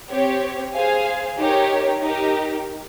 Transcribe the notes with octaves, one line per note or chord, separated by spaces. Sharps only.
C4 G4 C#5
G#4 C5 F5 G#5
D#4 G4 A#4 C#5
D#4 G4 A#4